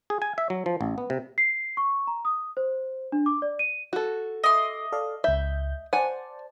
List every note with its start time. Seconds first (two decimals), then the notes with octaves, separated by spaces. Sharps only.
0.10 G#4
0.22 G#5
0.38 E5
0.50 F#3
0.66 F3
0.81 A1
0.98 B3
1.10 C3
1.38 C7
1.77 C#6
2.07 A#5
2.25 D#6
2.57 C5
3.12 D4
3.26 D6
3.42 D5
3.59 D#7
3.93 F#4 A4
4.44 D#5 E5 C6 D6
4.92 A4 D5 F5
5.24 C#2 E5 G6
5.93 C5 D5 F#5 G#5 A5